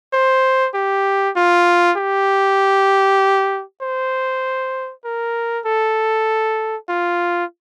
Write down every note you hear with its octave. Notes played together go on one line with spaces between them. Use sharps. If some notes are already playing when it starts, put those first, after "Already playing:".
C5
G4
F4
G4
C5
A#4
A4
F4